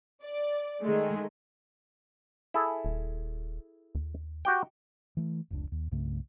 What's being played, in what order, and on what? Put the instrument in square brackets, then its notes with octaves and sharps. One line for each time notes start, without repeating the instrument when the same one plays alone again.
[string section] D5
D#3 G#3 A3
[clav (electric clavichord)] E4 G#4 A4
[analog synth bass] D#1
D#2
[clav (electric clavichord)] F#4 G4 G5
[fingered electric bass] E3 A3
F1 C#2 D4
D#2
C2 G2 C#3 A3